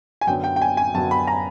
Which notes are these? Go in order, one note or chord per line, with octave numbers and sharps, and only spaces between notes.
G#5
F#2 D3 F#3 B3 G5
G5
G5
G#5
G#5
F#2 D3 F#3 B3 A5
B5
A#5